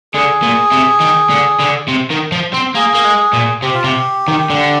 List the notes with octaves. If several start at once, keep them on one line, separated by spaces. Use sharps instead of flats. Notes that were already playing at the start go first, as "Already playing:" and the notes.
D3 G#4
A#2
C3
D#3
D3
D3
C3
D#3
F3
C4
A#3 G#4
A#3
G#3
A#2
C3 G4
F4
C3 G4
D#3
D3